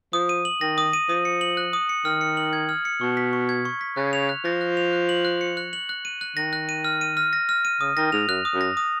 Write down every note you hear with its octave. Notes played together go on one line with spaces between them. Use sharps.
F3 D#6
D#7
F#7
D#3 A#6
D#6
D#7
F3 D#6
C#7
F#7
F#6
D#6
C#7
D#3 F6
C#7
F#7
G#6
F6
C#7
B2 C#6
B6
C#6
G#6
C#6
B6
C#3 F#6
F7
F#6
F3 A#6
F#6
F7
F#6
F#7
F#6
C#7
F#6
F#7
F#6
D#7
F#6
D#3 A#6
F#6
D#7
F6
D#7
F6
A#6
F6
D#7
C#3 D#6
D#3 A#6
G#2 F7
F#2 F#6
D#6
F#2
A#6
D#6